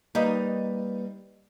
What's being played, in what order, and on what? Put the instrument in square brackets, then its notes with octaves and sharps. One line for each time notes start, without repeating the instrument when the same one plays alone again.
[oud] G3 D#4 [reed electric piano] A#3 B4